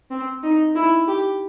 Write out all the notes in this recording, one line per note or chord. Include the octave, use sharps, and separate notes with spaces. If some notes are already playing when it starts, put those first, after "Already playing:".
C4
D#4
E4
G4